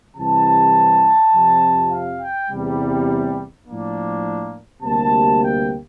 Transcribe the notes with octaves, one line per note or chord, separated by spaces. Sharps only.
C2 C3 E3 A5
F2 C3 F3
F5
G5
E2 C3 G3
A2 F3 A#3 D4
D2 C3 G3 A#3 A5
G5